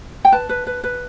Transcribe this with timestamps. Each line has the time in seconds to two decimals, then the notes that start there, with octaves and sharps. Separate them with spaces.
0.25 G5
0.32 B4 A5
0.49 B4
0.67 B4
0.84 B4